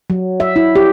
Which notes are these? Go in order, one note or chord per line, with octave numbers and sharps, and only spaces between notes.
F#3
E5
E4
G4